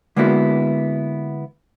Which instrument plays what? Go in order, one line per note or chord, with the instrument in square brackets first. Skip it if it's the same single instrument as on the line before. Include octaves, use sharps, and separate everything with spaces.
[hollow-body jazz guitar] D3 G#3 A#3 B3 E4 F#4